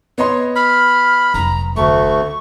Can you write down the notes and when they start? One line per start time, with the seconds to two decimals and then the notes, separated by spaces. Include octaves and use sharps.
0.18 B3 C#5 D#5 C6
0.56 B5 F6
1.34 F1 F#3 A#5
1.76 D2 A3 C#6